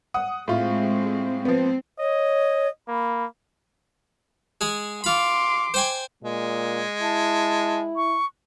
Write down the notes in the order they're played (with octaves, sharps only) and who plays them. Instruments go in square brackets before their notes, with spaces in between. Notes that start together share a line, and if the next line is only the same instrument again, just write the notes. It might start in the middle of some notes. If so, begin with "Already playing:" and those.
[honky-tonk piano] F#5 D#6
[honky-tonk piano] A2 F4 [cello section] G#3 C4
[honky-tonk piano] F3 B3 [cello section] C4
[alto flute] C#5 [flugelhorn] D#5
[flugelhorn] A#3 [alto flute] B5
[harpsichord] G#3 G#4
[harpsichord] F4 B5 [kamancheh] C6 D6
[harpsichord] C5 G5 G#5
[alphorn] A#2 [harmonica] G#3
[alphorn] E4 [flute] A5
[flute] C#6